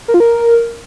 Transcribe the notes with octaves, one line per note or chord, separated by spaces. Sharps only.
A#4
F4
A#4